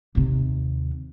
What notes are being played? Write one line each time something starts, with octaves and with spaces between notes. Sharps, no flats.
D#2 C3